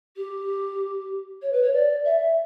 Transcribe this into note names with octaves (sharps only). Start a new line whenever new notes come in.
G4
C#5
B4
C#5
D5
E5